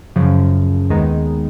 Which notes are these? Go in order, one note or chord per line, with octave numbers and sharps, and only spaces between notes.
F#2 C#3 F3
D#2 D#3 G#3 B3 D#4